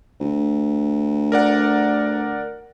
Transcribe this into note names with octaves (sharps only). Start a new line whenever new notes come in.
D2
A#4 D5 F#5